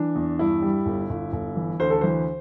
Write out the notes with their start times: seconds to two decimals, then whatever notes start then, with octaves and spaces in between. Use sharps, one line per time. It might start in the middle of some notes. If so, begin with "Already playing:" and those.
Already playing: E3 D4
0.16 E2
0.39 G2 E4
0.62 G3
0.86 G1
1.10 G1
1.33 G1
1.56 E3
1.80 D2 C5
1.90 A4
2.01 E3 C5